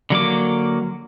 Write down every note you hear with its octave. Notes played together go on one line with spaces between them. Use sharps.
D3 F#3 A#3 D6